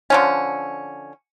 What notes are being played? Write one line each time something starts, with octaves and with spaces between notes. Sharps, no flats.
D3 F3 C#4